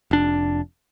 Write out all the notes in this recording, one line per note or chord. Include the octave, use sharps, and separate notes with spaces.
F1 D4